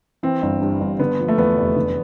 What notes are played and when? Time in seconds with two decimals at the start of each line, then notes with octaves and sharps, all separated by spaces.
0.23 E3 C4
0.42 G1
0.61 G2
0.81 G1
1.00 D3 B3
1.19 F3
1.28 A3
1.38 E2 B3
1.57 F1
1.76 D3